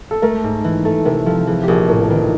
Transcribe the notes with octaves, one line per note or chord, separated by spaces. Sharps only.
A4
A3 A#4
G#2
E3
A3 A4
C3 A#4
F3 A4
E3 G#4
G4
A#1 G#4
A2 A#4
A#4
D#3 B4